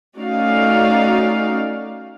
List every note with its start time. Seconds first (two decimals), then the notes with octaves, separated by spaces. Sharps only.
0.18 A3 C#4 D#4 F#4 D5 F5